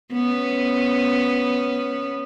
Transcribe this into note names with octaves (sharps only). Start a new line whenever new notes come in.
B3 C#4